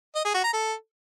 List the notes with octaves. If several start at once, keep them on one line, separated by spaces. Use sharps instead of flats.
D#5
G#4
F#4
A#5
A4